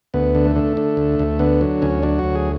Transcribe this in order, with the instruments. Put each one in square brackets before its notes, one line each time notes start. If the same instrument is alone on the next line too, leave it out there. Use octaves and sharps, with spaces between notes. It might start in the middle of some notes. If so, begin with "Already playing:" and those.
[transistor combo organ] D2 B3
D3
A3
D3
D3
D2
D2
D3 B3
F#3
D2 C#4
F#3 D4
D2 F#4
G#4